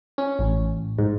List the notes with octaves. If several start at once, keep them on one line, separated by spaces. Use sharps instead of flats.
C#4
A1
G#2